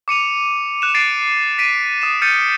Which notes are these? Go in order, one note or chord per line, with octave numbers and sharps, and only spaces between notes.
D6 C#7 D#7 F7
F#6 E7
A6 C7 D7 D#7
B6 D7 D#7
D#6 E7
F6 G6 A6 C#7 D#7